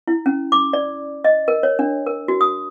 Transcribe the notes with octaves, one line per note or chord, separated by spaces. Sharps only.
E4
C#4
D6
D5
D#5
A#4
C#5
D4
A#4
F#4
D#6